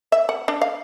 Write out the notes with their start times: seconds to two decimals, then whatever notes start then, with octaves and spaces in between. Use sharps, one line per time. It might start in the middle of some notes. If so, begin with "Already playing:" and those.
0.12 E5
0.29 F#5
0.48 D4
0.62 F5